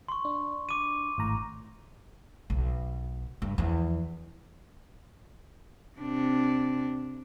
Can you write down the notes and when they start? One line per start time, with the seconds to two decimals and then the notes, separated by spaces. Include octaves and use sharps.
0.08 C6 C#6
0.25 D4
0.69 D6 D#7
1.18 G#1 A2 A#5
2.50 B1
3.42 G2
3.58 E2 F3
5.98 C3 D4